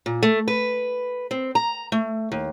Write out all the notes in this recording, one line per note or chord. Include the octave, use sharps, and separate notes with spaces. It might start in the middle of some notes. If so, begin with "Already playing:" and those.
A#2
A3
B4
C4
A#5
A3
D#2